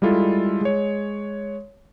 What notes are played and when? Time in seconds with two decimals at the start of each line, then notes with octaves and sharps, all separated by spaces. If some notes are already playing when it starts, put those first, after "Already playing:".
0.02 G3 G#3 E4 F4 A4
0.61 G#3 C#5